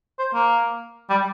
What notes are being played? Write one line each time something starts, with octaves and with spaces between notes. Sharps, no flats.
C5
A#3
G3